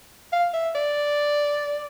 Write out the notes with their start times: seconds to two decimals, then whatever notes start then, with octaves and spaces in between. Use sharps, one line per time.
0.33 F5
0.54 E5
0.75 D5